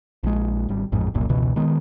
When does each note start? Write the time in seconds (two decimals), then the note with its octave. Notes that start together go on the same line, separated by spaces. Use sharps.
0.23 A#1 G#3
0.69 G#1 G3
0.92 A1 F2 G#2
1.14 F1 C2 F#2 A#2
1.29 F1 C#2 B2 E3
1.56 D#3 G#3 B3